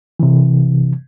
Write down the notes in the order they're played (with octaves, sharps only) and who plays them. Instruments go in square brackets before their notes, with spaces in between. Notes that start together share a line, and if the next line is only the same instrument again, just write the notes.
[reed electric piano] C3 E3